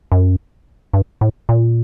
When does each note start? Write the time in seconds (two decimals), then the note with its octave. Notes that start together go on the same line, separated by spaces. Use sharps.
0.12 F#2
0.93 G2
1.21 A2
1.49 A#2